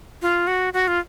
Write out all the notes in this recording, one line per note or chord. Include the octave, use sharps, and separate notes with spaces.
F4
F#4
F#4
F4